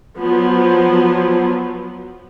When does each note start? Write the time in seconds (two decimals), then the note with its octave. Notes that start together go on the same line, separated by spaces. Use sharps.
0.17 F3 F#3 B3